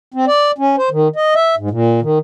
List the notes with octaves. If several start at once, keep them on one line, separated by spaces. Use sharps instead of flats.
C4
D5
C#4
C5
D#3
D#5
E5
G#2
A#2
D#3